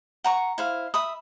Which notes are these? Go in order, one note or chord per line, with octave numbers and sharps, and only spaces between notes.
F#5 A#5 C#6
E4 C5 F5
E5 B5 D#6